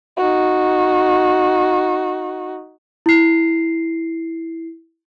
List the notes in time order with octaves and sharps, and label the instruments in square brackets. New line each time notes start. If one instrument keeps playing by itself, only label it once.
[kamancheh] D#4 F#4
[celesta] E4 C7